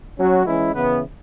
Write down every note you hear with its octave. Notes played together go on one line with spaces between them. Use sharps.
F#3 C#4 F#4
E3 G#3 C#4 E4
C#3 E3 B3